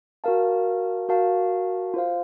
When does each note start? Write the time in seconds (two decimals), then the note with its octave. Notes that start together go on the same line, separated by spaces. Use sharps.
0.24 F#4 A#4 F5 A5
1.09 F#4 A#4 F5 A5
1.94 F4 C5 F5